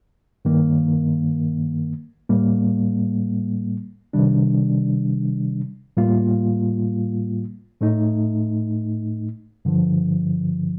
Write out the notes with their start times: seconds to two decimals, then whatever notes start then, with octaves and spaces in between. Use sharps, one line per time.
0.45 G2 D#3 A#3
2.29 A2 G3 A#3
4.13 C3 D#3 G3 D4
5.97 A2 G3 A#3 F4
7.80 A2 A3 D#4
9.65 G2 D3 F3